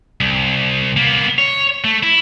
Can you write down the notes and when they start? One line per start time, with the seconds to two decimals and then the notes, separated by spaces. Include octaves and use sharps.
0.20 C2
0.97 A#3 B3
1.38 C#5
1.84 A3
2.03 E4